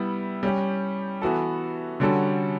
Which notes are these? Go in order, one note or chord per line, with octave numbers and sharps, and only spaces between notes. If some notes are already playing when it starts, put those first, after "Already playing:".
Already playing: G3 B3 E4
G3 C#4 G4
E3 B3 F#4 A4
D3 G3 C#4 F#4 A4